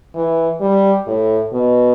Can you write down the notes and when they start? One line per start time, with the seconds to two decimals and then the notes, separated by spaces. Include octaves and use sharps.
0.15 E3
0.61 G3
1.07 A2
1.53 B2